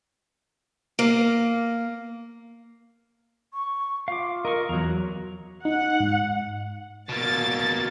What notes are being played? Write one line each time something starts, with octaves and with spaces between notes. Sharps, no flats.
A#3
C#6
F4 F5 D6
A#4 D#5 C#6
E2 F#3 A#5
D#4 F#5
G#2
B2 A#3 A6